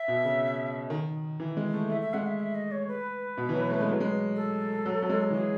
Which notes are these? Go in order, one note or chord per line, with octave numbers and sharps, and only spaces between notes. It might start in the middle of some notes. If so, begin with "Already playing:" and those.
Already playing: E5
B2
C#3
D#3
E3
G#3
A3
A3 E5
E5
G#3 F#5
E5
E5
D#5
C#5
B4
B2
E3
F#3
A3
G#3
F#3
G#3
A4
F#3
F#3
G#3
E3
F#3 G#4